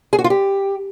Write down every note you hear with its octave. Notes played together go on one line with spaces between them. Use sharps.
G#4
F#4
F4
G4